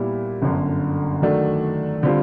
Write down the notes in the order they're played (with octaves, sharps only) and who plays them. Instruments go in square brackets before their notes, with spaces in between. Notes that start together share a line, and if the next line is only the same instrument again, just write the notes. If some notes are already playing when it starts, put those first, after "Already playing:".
Already playing: [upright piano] A#2 G3 B3 E4 G4
G1 F#2 D3
D#3 F#3 A3 D4 F#4
D3 G3 C4 F4